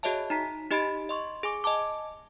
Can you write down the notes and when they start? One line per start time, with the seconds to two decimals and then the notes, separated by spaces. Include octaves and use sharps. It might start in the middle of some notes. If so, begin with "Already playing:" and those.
0.03 F#4 G#4 C#5 D#5 E5 A5
0.30 D#4 A#5 B6
0.70 D#4 G4 D#5 B5 A6 D7
1.09 D#5 C6 C#6
1.43 G#4 G#5 D6
1.64 D#5 G#5 A5 D6